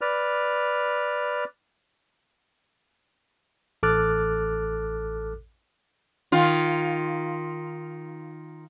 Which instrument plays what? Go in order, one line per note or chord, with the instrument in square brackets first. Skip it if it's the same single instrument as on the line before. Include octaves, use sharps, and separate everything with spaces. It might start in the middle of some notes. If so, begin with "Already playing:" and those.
[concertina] B4 D5 F6
[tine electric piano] A1 A4 D6 F6 F#6 A6
[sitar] D#3 F4